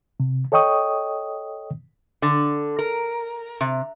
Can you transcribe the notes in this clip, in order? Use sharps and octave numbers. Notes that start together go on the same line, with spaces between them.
C3
A4 C#5 D#5 G5 C#6 D#6
D3
A#4
C3